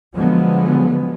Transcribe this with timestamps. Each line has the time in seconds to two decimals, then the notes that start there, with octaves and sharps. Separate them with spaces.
0.15 D3 F3 F#3 G#3 B3